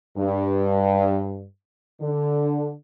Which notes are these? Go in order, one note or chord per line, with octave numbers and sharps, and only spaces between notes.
G2
D3